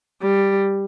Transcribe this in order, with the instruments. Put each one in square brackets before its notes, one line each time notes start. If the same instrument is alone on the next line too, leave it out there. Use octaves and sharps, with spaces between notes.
[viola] G3